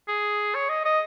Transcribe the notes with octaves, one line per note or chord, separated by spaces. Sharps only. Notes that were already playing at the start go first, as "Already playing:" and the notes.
G#4
C#5
D#5
D#5